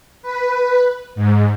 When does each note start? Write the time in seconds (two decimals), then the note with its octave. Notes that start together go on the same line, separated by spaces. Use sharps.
0.22 B4
1.15 G#2